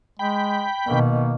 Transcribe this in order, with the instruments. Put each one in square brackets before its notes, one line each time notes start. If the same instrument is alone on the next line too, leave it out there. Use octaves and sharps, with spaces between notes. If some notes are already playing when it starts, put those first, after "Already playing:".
[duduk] G#3 [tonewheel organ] G5 B5
[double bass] B2 D#3 [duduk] A#3